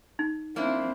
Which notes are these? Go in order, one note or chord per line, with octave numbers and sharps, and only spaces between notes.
D#4
A#3 C4 D4 E4